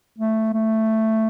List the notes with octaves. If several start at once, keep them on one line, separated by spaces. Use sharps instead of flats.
A3
A3